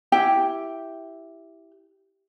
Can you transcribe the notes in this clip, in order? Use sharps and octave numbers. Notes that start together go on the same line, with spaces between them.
E4 G4 G5